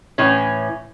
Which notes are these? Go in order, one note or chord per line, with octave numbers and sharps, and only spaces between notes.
A2 E3 C#4